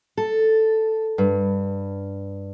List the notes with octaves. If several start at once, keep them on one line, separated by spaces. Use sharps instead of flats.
A4
G2